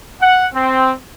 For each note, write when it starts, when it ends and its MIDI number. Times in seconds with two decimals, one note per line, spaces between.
0.21 0.46 78
0.53 0.93 60